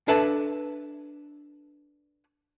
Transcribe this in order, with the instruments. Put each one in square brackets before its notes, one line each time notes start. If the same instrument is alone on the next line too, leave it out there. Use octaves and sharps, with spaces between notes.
[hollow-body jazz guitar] D4 A4 B4 E5 A5